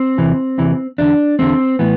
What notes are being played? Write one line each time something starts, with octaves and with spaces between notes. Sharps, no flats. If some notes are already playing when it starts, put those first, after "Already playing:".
Already playing: C4
E2 C3 E3
E2 C3 E3
E2 D3 D4
E2 D3 C4
A2 E3 B3